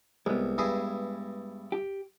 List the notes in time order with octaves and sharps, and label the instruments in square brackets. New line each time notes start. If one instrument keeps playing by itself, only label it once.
[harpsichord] C2 [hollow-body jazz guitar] G#3 B3
[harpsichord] G2 E4 G#4
[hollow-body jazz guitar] G4